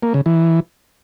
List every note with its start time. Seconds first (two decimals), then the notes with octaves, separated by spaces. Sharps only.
0.03 A#3
0.14 C#3
0.26 E3